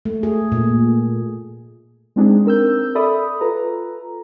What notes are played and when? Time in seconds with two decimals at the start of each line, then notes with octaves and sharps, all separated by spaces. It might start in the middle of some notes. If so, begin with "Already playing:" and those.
0.05 A3
0.23 G#4
0.52 A#2
2.16 G#3 C4 D4 D#4 G#4
2.45 C4 A#4 E6 G6
2.95 A4 D5 E5 B5 D#6
3.41 F4 A4 B4 A#5